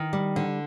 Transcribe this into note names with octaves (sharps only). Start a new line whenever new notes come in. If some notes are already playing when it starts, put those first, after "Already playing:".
Already playing: D#3
G3
D3